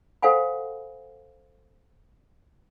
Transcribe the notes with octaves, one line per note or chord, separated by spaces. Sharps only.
A4 C5 F5 F#5 G#5 B5